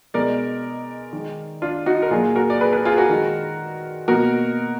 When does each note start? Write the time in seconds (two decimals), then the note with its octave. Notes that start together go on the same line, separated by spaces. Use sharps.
0.14 B2 G#3 A#4 D5
1.13 D#3 G#3
1.62 D4 F4
1.86 D#4 F#4
2.02 A#4
2.11 A#2 F#3 A#3 F4 G#4
2.36 F#4 A#4
2.50 D5
2.61 G#4 B4
2.73 G#4 B4
2.85 F4 G#4
2.97 F#4 A#4
3.09 D#3 G#3
4.08 B2 A#3 F#4 A#4